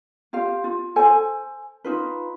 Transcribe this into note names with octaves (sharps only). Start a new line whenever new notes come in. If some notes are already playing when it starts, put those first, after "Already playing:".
F4 G4 F5
F4
A4 C5 G#5
D#4 F4 B4